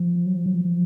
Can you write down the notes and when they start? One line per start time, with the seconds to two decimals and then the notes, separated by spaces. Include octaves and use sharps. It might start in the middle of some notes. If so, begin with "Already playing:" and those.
Already playing: F3
0.26 F#3
0.36 F3
0.46 F#3
0.54 F3
0.65 F3